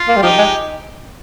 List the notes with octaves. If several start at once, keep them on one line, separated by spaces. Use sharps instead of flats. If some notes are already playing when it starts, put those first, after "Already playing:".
Already playing: F4
A#3
G3
F3 D#4 G4
G#3